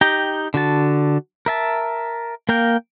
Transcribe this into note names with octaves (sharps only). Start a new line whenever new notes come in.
D#4 G4 G5 A#5
D3 F#4 A5
A#4 E5 A5
A#3 A#4 F5 G5